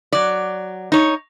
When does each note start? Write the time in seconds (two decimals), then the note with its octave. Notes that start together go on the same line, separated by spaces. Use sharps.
0.12 F#3 D5
0.92 D#4 C#5